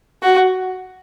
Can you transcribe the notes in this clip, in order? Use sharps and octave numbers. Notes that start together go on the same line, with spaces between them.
F#4